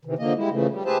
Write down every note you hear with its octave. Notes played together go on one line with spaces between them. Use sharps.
C3 D#3 E3
D3 F3 A#3 D#5
G3 G#3 E4
C#3 E3 F3 A3
G3
G4 G#4 B4 C5 E5 A5